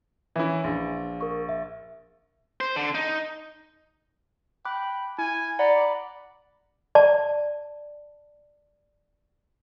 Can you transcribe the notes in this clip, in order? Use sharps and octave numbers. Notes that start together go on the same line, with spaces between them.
E3 C#4 E4 B4 E5
A#1
A#4 C#6
E5
C5
D3
D#4
G5 B5 D6 F#6
E4 G#5
D5 F#5 A#5 B5 C#7
D5 A5